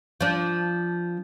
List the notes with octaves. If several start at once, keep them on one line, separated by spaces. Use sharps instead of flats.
F3 D4